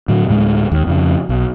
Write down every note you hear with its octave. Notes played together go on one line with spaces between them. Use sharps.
A2 D3 F#3
D2 A2 G3 G#3
D#2
F2 C#3
B1